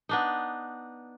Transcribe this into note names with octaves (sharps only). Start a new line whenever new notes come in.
B3 D4 D#4